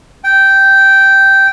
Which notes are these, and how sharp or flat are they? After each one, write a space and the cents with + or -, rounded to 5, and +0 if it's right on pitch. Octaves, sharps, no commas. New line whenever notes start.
G5 -10